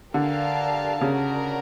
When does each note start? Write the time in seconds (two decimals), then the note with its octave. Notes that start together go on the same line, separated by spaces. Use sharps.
0.14 D3 G4 A#4 D5 F5 A5
1.01 C#3 D4 F#4 A#4